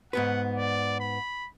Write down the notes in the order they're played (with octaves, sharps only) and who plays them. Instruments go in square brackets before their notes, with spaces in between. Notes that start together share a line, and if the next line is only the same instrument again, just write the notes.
[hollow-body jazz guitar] G#2 B3 B4 [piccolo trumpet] F#5
[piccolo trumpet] D5
B5